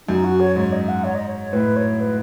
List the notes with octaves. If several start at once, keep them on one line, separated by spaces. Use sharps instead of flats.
F#2 D#4
F#4
C#5
G#2 C#5
D#5
F#5
C#5
D#5
C#5
A2 B4
C#5
B4